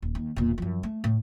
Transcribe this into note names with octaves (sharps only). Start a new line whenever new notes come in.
D#1
D#2
E1 A#2
F#2 F3
A3
A2